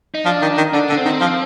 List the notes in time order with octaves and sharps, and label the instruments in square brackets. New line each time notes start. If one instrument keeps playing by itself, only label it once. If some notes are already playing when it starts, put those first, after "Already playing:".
[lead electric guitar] D#4
[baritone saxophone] F3 [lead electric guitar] D4
[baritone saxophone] D#3
D#3
[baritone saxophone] D3 [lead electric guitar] D4
[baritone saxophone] D3
[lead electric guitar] D4
C4
[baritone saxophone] D#3
F3